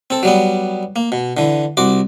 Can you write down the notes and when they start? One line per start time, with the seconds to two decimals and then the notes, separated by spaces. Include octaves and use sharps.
0.10 C4 A4
0.23 F#3 G3 B3
0.96 A#3
1.12 B2
1.37 D3 E3
1.77 C2 F#4 C6 D6